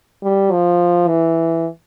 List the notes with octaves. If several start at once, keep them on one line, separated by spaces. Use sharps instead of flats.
G3
F3
E3